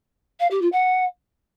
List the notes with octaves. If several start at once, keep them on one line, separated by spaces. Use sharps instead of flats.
F5
G4
F4
F#5